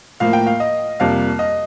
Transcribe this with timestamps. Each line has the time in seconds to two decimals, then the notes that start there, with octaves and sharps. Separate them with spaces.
0.20 A2 F3 A#3 F5
0.33 G5
0.46 F5
0.60 D#5
1.00 F2 C3 G3 A#3 F5
1.39 D#5